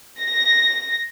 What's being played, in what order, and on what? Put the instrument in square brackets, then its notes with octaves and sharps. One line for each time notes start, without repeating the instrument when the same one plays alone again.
[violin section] A#6